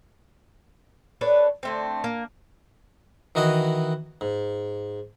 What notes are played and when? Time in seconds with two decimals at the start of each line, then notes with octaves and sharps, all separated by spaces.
1.21 D4 A4 B4 C#5
1.63 D3 A3 C4
2.04 A#3
3.35 D#3 E3 F#4 D#5 G#5
4.21 G#2